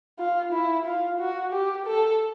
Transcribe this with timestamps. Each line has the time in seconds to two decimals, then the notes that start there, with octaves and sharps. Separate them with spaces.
0.19 F4
0.53 E4
0.85 F4
1.20 F#4
1.52 G4
1.86 A4